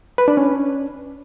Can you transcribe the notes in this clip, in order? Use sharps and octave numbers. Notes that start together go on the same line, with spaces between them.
B4
D4
C#4